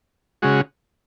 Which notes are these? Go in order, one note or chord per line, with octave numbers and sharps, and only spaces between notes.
C#3 G#3 F#4